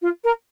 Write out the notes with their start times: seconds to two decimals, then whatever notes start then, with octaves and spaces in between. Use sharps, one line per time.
0.02 F4
0.24 A#4